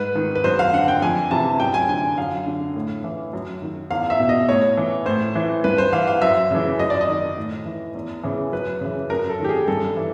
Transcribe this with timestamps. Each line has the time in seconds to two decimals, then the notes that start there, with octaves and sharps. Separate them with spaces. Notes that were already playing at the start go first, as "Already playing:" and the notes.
Already playing: G#2 B4
0.15 D#3
0.35 B4
0.44 F#2 C5
0.59 F5
0.73 D3 F#5
0.88 G5
1.02 F2 G#5
1.31 C3 E3 A5
1.60 F#2 G5
1.74 G#5
1.88 D3 G#5
2.18 F#2 F5
2.46 D3
2.76 A2
3.04 E3
3.33 F#2
3.62 D#3
3.90 E2 F5
4.10 E5
4.19 B2
4.29 D#5
4.49 A2 C#5
4.77 E3
5.06 A2 C5
5.35 E3
5.64 G2 B4
5.78 C5
5.93 E3 F5
6.07 F5
6.22 F#2 E5
6.50 C#3 E3
6.79 F#2 D#5
6.90 D5
7.01 D#5
7.08 D#3
7.37 A2
7.66 E3
7.95 E2
8.23 C#3 E3
8.52 F#2 B4
8.81 C#3 E3
9.10 F#2 A#4
9.29 A4
9.40 D#3 G4
9.49 G#4
9.68 G2 A4
9.97 E3